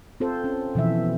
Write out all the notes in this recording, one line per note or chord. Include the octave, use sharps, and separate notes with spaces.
C4 F4 A4 C5
C#4
B2 E3 F3 E5